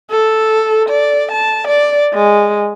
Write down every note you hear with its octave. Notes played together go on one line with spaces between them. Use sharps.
A4
D5
A5
D5
G#3